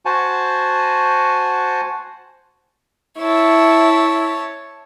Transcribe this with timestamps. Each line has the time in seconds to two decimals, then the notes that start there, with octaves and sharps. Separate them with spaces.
0.05 F#4 C5 F#5 G#5 A5
3.20 E4 C#5 A5